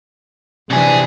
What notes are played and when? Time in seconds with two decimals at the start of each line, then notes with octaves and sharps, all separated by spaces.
0.70 F2 C3 E3 D4 G#4